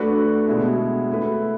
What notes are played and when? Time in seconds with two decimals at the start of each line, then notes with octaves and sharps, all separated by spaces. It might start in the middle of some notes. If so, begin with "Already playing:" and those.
Already playing: A3 D4 F#4 B4
0.48 B2 G#3 B3 E4
1.09 A3 E4 B4